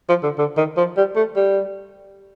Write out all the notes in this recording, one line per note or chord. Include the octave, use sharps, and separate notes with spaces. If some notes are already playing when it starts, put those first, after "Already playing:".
F3
D3
D3
D#3
F3
G3
A3
G3